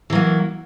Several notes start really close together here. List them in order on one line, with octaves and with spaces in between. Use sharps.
E3 F#3 A#3